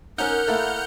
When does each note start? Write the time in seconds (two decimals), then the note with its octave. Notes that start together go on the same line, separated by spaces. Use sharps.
0.18 C#4 D#4 A#4 F#5 F6 G6
0.48 A3 A#3 E4